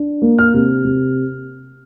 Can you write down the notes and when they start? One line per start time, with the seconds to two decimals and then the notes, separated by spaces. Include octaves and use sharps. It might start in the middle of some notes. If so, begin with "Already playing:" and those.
Already playing: D4
0.22 A#3
0.38 F6
0.54 C3
0.85 C3